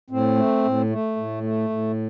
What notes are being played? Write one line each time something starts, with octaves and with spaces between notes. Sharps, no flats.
A2 C4
A3
A2
A3
A2
A3
A2